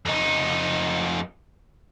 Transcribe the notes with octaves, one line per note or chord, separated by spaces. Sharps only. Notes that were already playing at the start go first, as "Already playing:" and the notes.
F2 D#4